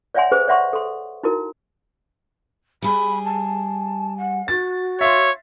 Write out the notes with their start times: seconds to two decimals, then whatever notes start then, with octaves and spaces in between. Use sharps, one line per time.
0.14 C#5 D5 E5 F#5 G#5 C6
0.32 G#4 A4 B4 C5
0.47 C#5 D5 E5 F#5 C6 C#6
0.73 A4 C6
1.23 D#4 E4 F#4 A#4
2.82 G3 G#4 B5
3.24 A5
4.17 F#5
4.48 F#4 A6
5.01 C#5 E5 F5 C6